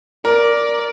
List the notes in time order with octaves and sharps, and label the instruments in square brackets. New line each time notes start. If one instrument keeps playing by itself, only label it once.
[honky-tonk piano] A#4 [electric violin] D5